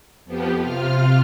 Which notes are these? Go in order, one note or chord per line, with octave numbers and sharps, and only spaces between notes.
F2 F3 B3 G4
C3 F4 F6